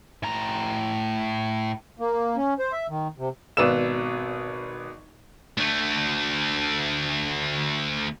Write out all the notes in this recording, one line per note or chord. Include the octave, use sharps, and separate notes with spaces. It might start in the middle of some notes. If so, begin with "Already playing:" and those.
A2 A#5
A#3
C#4
C5
E5
D#3
C3
G#1 B2 B4 D5 E6 E7
D2 A3